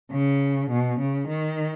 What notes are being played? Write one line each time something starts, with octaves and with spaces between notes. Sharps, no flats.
C#3
B2
C#3
D#3